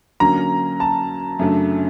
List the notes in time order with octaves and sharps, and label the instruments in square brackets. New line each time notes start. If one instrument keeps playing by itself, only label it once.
[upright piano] D3 F#3 A#3 C#4 [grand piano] A#5
[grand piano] A5
[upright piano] F#2 C#3 F#3 A3 D4